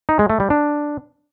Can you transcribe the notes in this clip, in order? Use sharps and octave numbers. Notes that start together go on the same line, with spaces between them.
D#4
G#3
A3
G3
D4